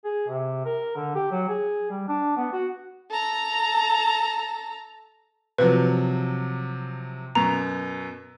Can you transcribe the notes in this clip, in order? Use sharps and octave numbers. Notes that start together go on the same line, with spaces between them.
G#4
C3
A#4
D3
G4
F#3
G#4
G3
D4
B3
F#4
A4 A#5
C3 F3 F#3 B4
F#2 B2 A#5